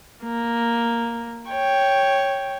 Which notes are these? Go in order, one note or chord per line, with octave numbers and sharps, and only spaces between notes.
A#3
C#5 G5